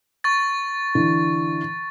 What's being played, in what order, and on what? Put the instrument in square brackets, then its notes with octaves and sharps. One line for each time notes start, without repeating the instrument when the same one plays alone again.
[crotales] C#6 A6
[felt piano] D3 E3